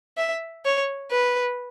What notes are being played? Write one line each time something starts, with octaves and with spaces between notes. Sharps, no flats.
E5
C#5
B4